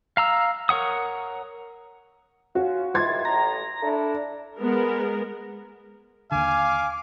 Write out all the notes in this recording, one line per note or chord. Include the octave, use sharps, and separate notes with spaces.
F5 A#5 E6
A#4 C#5 F#5 D#6
C#4 F4 F#4
C#2 D#3 E4 C6 G#6 A6
A1 A2 A#5
D4 E4 A4
G#3 B3 A#4
D#2 D3 F5 G#5 D6